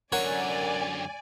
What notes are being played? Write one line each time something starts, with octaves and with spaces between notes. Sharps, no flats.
F#2 D3 A#4 C#5 D5 F#5 G#5